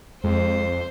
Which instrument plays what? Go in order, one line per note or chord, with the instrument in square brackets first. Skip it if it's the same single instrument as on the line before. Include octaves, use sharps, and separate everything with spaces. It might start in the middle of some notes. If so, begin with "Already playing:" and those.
[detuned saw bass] F2 [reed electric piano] G#3 [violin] C5